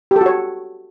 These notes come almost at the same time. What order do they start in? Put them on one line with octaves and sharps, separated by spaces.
G4 A4 F#4 C#5